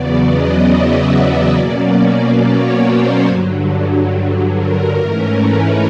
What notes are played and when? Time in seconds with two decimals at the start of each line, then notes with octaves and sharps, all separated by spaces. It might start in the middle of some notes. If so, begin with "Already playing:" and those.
Already playing: E2 C#3 F#3 B3 D5
0.26 D#5
0.68 E5
1.11 D#5
1.54 B2 F#3 A#3 C#4 D5
2.40 C#5
2.82 C5
3.26 G2 D3 F#3
4.54 A#4
4.96 G#2 E3 A3 C#4
5.40 B4